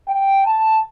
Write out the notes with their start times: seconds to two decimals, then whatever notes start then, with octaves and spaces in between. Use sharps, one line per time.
0.09 G5
0.46 A5